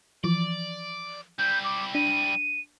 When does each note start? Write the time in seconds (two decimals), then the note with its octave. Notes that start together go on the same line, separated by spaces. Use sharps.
0.24 E3 F3 D5
1.39 G3 E4 G6
1.64 D6
1.95 D4 D#7